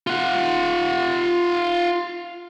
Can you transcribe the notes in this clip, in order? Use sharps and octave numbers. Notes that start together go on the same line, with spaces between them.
F4 F#5